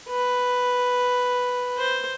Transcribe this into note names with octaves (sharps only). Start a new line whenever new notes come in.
B4
C5